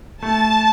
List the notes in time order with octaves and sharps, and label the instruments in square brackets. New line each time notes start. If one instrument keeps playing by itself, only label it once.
[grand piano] A3 [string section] A5